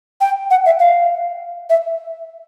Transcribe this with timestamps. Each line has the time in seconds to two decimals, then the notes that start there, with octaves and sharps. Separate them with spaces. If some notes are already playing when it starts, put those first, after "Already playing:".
0.21 G5
0.51 F#5
0.66 E5
0.79 F5
1.70 E5